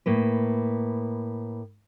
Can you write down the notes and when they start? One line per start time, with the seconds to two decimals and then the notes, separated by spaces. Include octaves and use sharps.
0.06 A2 A#3 B4